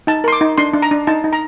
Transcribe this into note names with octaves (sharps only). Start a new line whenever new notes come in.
D#4 A5
A#4 C6
D6
D#4
D4 C6
D4
A#5
D4
D#4 A5
D#4
A#5